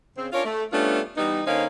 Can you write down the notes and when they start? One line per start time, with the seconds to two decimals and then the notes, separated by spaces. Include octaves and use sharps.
0.17 C#3 C4
0.33 C#4 D4 F4 A#4 C#5
0.45 A3
0.72 G3 A3 B3 C#4 D4 F4
1.17 E3 G3 B3 D#4
1.46 D3 A#3 C#4 D#4 C5 F5